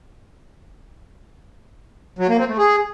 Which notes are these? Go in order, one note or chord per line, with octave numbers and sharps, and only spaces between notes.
F#3
A#3
C4
A3
G#4